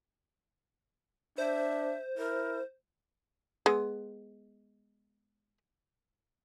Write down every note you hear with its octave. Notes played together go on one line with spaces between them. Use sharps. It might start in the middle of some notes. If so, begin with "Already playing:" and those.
D4 C5 E5
E4 A#4
G#3 B3